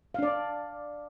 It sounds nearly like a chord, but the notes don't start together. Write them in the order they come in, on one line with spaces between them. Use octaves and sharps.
F5 D4 D5